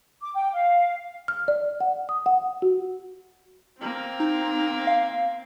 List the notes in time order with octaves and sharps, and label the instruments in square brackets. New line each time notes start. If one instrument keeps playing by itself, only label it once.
[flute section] D6
G5
F5
[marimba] F6
D5
F#5
D#6
F#5
F#4
[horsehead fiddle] A#3 C4
[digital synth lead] D#4
F5